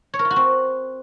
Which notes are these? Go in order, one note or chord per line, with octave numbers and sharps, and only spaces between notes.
C#5
A#4
F4
F#4
C4